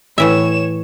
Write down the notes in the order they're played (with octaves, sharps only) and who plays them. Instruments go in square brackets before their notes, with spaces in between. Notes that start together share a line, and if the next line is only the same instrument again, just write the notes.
[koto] A2 E3 E5 [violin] C#5 E7